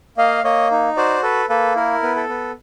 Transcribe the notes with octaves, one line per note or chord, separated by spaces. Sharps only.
A#3 D#5 F5
A#3 C#5 D#5
D#4
F#4 C5 D5
A4 B4
A#3 A4 B4
E4 A#4
B3
A4
B3